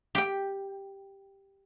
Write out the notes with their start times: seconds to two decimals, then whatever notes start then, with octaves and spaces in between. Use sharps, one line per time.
0.15 G4 G5